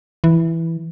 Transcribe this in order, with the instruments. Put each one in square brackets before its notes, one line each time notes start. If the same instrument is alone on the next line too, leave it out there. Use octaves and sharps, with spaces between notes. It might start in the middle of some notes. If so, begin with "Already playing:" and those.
[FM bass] E3